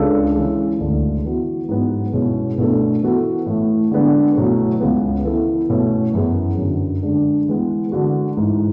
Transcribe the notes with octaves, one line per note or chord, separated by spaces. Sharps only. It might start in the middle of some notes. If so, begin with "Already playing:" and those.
Already playing: C#2 C#3 G#3 D4 A4
C#3 E3 G#3
D2 D3 G#3 D4
E3 B3 F#4
G#2 F#3 B3
B2 G#3 C#4 E4 G#4
B2 A3 D4 A4
E3 B3 F#4 A4
A2 E3 A3
D3 G#3 B3 D4
B2 F#3 A3 E4
C#2 C#3 G#3 B3
E3 B3 E4 A4
B2 A3 C#4 E4 A4
F#2 E3 B3 E4 G#4
F#2 D3 F#3
D3 G#3 D4
E3 G#3 B3
D3 G#3 D4 F#4
G#2 E3 G#3